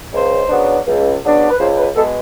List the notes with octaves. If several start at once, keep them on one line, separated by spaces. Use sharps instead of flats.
C#2 C5
C#3 F#3 B3 D4
C#2
C#3 F#3 B3 D4
B4
C#2 C5
B4
B2 G#3 B3 A4